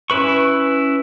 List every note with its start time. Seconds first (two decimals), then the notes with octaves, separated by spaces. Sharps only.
0.10 C#4 E4 B4 C#6